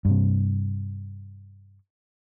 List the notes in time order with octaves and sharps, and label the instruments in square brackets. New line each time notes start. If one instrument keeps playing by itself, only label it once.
[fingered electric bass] G2 C3